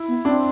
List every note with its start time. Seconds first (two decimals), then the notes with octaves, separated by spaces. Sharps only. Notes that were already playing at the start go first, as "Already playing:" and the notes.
Already playing: E4
0.08 B3
0.25 C4 D4